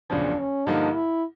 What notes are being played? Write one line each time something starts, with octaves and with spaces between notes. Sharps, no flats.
F#1 E2 C#3 F3 D4
C#4
G2 D3 F3 A#3 D#4
E4